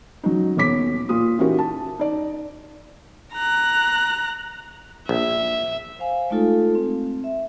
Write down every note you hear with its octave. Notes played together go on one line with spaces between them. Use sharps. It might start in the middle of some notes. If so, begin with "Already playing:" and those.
C#3 F#3 D#4
D#1 B1 C#5 D6 B6
A#2 F4 D#6
E3 C#4 D#4 F#4 G4 A#4
A5
D#4 D5
A#5 F#6
A#1 E5
C5 F5 G#5
G#3 A3 D#4 F4 A4
C4
E5